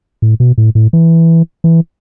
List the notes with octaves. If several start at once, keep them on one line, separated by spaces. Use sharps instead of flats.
A2
B2
A2
A2
E3
E3